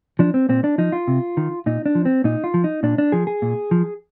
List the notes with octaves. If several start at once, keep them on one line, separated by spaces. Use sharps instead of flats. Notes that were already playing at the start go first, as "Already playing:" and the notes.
F3 D4
C4
A#2 C4
D4
F3 D#4
F4
C3
D#3
A#2 D#4
D4
F3
C4
A#2 D#4
F4
F3
D#4
A#2 D4
D4
F3 G#4
G#4
A#2
F3